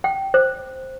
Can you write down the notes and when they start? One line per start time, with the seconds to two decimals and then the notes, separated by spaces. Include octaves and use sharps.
0.04 G5
0.34 C5